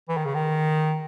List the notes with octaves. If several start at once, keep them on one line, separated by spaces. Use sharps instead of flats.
E3
D#3
C#3
D#3